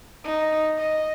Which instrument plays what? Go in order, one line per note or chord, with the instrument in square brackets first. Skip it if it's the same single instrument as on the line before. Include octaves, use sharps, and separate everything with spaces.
[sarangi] D#4
D#5